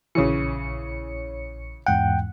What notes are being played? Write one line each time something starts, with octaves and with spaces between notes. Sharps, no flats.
A#1 C#3 E3 C#5 C#7
E2 G#2 F#5 G5